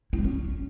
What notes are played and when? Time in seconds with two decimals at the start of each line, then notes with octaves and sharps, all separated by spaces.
0.13 E4
0.19 G#3
0.24 C#4